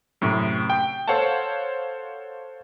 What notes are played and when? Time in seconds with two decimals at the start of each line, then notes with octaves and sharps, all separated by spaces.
0.21 F#2 A2 C3
0.70 G5
1.08 A4 C5 C#5 F5 F#5 A5